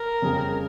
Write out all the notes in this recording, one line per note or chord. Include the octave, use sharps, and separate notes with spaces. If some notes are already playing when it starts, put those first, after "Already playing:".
Already playing: A#4
F2 C#3 G3 C#4 G#4